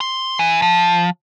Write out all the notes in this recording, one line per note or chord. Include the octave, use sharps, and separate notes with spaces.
C6
E3
F3